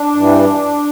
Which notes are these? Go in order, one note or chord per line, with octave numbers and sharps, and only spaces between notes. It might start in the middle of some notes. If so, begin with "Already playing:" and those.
Already playing: D4
G2 E3 G3